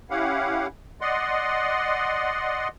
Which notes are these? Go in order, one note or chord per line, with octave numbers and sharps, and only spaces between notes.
C#4 E4 G4 F5 F#5
D5 D#5 F#5 C6